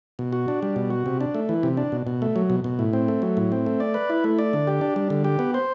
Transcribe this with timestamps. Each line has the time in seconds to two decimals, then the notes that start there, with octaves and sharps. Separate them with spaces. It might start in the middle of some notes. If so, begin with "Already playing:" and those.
0.19 B2
0.33 F#4
0.48 D4
0.63 G3
0.76 B2
0.90 F#4
1.06 C3
1.21 D4
1.35 A3
1.49 E3
1.63 C3
1.77 D4
1.92 B2
2.07 B2
2.22 A3
2.36 F#3
2.50 B2
2.64 B2
2.79 A2
2.93 C4
3.08 A3
3.22 F#3
3.37 A2
3.52 C4
3.66 A3
3.80 D5
3.94 B4
4.10 E4
4.24 A3
4.39 D5
4.53 D3
4.67 G4
4.81 D4
4.96 G3
5.10 D3
5.24 G4
5.39 B3
5.54 C5